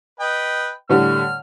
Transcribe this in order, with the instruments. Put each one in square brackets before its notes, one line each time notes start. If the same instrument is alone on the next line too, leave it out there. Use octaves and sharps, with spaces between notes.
[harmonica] B4 D#5 G5
[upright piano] A2 D3 G3 [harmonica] F6